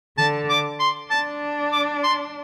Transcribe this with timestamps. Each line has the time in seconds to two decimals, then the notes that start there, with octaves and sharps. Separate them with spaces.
0.18 D3 A5
0.49 D6
0.80 C6
1.11 D4 A5
1.72 D6
2.03 C6